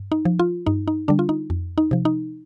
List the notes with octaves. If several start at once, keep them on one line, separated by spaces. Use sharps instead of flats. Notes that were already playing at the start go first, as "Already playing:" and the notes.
Already playing: G2
D#4
F3
F4
G2 D#4
D#4
D3 G3 D4
F4
D#4
F2
D#4
C3 F3
D#4